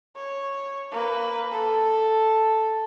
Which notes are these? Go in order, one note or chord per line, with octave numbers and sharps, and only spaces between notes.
C#5
A#3 B4
A4